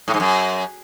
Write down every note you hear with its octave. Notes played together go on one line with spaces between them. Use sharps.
A2
G#2
F#2